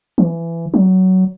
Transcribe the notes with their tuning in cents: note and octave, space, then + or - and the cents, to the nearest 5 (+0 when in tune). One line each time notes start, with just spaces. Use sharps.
E3 +20
F#3 +15